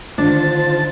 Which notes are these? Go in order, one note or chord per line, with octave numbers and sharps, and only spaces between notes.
D3 D#3 D4 F4 C5 A5